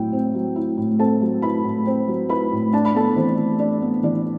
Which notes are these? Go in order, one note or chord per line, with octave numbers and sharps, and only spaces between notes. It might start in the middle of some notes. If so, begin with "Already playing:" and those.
Already playing: A2 F#3 C4 E4 G5
C4
F#3
E4
A2
C4 A4 A5
F#3
E4 B4 B5
A2
C4
F#3
E4 B4 B5
A2
D4 A5
B5
B3 A4 A5
E3 C4 C5
E3
D4 D5
B3
E3 D4 D5